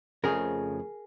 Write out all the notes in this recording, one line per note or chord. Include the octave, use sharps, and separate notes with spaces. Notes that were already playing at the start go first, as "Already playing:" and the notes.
F2 C#3 F3 A3 G#4 A#4